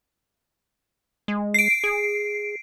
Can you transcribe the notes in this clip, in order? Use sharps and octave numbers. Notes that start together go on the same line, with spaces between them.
G#3
C7 D7
G#4